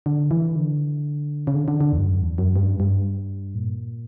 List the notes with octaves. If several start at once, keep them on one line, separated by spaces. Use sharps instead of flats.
D3
E3
D3
C#3
D3
D3
D3
E2
G2
F#2
E2
F#2
G2
G2
A#2